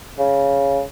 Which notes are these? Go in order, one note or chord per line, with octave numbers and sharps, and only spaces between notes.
C#3